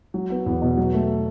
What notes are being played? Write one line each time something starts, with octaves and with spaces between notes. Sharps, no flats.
F#3
B3
E2
B2
F#3
A3